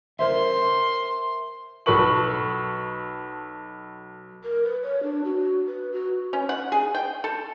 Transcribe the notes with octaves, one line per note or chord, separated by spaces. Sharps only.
A#4 C5 E5 C6
B1 A4 B4 C#6 F#7
A#4
B4
C#5
D4
F#4
B4
F#4
C#4
F#5
G#4
G5
A4